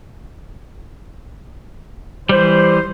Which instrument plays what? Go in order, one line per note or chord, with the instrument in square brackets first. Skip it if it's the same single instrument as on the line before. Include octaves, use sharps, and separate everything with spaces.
[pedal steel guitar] E3 G3 [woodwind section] C5